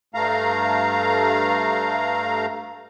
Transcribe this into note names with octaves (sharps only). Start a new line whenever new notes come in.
G2 A3 F5 A#5